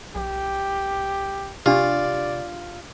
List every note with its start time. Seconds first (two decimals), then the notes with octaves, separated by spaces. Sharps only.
0.15 B1 G4
1.66 C3 D4 F4 G4 D5